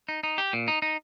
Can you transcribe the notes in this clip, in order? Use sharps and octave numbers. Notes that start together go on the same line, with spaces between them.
D#4
D#4
G4
A#2
D#4
D#4